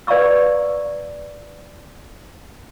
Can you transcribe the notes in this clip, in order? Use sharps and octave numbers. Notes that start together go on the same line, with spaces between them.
B4 D5 F5 A#5 C#6 E6